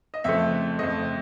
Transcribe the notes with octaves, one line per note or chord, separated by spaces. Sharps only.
D#5
F2 C#3 F3 A3 E5
F2 C#3 F3 A3 D#5